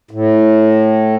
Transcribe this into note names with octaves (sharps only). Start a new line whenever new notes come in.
A2